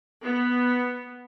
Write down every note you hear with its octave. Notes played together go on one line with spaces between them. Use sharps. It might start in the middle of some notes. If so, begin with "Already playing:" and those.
B3